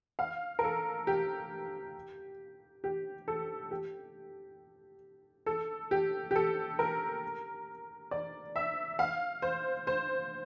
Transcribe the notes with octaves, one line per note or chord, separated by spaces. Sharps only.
F5
A#4
A4
G4
G4
A4
G4
A4
G4
G4
A4
A#4
D5
E5
F5
C5
C5